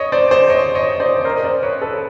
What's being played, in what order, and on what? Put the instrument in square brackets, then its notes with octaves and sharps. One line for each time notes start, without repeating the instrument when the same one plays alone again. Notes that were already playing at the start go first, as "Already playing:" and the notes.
Already playing: [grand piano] C#5 D#5
C5 D5
C5 D5
C#5 D#5
C#5 D#5
C5 D5
A#4 C5
D#5
C5 D5
B4 C#5
A4 B4